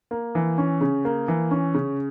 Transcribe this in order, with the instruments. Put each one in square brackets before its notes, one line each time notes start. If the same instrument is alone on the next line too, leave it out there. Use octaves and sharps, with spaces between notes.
[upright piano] A#3
E3
C#4
C#3
A#3
E3
C#4
C#3